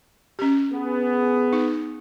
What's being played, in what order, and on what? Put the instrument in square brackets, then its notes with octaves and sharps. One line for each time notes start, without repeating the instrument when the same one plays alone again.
[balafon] C#4 G4
[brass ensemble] B3 G#4
[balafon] D#4